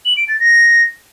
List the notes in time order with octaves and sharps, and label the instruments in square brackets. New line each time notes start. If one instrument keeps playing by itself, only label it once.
[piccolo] F#7
D7
A6
A#6